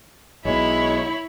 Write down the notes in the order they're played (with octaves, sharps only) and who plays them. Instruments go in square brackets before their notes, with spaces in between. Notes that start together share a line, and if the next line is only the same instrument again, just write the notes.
[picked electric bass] B1 B2 [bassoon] G#3 [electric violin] E4 B5 [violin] C#5